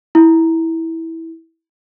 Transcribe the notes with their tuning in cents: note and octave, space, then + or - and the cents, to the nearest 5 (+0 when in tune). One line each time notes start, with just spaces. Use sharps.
E4 -15